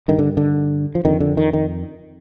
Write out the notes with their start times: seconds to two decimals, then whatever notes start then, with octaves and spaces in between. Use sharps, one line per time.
0.08 G2 D3 D#3
0.19 D3
0.37 D3
0.95 F3
1.05 F2 D3 D#3
1.20 D3
1.37 D#3
1.53 D#3